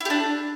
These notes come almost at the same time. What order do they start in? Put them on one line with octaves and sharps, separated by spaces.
E4 G4 D4